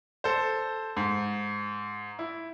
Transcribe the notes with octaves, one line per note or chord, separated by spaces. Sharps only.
A4 C5
G#2
E4